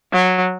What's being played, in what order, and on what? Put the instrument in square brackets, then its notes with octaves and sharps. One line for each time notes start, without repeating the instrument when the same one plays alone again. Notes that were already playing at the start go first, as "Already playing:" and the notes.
[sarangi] F#3